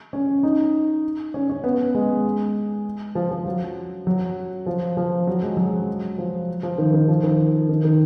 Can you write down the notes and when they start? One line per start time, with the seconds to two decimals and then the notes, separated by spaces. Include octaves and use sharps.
0.13 C#4
0.43 D#4
1.34 C#4
1.49 C#4
1.64 B3
1.94 G#3
3.15 F3
3.31 F3
3.46 F#3
4.07 F#3
4.66 F3
4.97 F3
5.27 F#3
5.42 G#3
5.57 F#3
6.18 F3
6.63 F3
6.78 D#3
6.94 D#3
7.08 F3
7.23 D#3
7.69 D#3
7.84 D#3